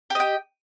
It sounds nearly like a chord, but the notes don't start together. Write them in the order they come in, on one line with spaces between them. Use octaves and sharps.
G4 D#5 G5